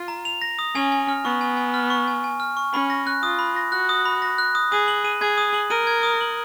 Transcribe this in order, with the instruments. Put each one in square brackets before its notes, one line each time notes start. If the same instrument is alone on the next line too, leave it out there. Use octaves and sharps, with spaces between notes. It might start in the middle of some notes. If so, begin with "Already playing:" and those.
Already playing: [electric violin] F4
[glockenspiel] A#5
F7
A#6
D#6
[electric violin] C#4 [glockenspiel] G#5
[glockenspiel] G#5
F6
[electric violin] B3 [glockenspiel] C#6
[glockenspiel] G#5
G#5
F6
C#6
G#5
G#5
F6
C#6
[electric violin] C#4 [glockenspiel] B5
[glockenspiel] A#6
F#6
[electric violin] F4 [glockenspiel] D#6
[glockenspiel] B5
A#6
[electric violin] F#4 [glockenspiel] F#6
[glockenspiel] D#6
B5
A#6
F#6
D#6
[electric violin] G#4 [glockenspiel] D#6
[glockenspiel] F#7
D#7
[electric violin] G#4 [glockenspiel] G#6
[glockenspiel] D#6
F#7
[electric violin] A#4 [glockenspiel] D#7
[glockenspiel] G#6
D#6
F#7